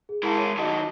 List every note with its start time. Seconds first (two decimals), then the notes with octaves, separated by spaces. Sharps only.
0.09 G#4
0.23 G#3 E4 A#4 A5
0.37 C#5 D#7
0.57 D#3 F#3 D#5 A5 D6